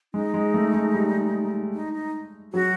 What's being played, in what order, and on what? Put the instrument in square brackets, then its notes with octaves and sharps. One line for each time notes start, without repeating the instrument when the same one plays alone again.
[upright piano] G#3 [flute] D#4
[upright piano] G#3
A3
G#3
G3
[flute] D#4
D#4
[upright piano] F#3 [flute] F#4